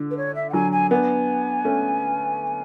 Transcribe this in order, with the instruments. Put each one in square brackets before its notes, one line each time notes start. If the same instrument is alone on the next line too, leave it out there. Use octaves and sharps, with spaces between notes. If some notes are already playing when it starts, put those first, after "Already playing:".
Already playing: [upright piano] D3
[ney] B4
C#5
E5
F#5
[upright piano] D3 F#3 [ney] G#5
[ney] G#5
[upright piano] B3 D4 [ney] G#5
[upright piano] A3 C#4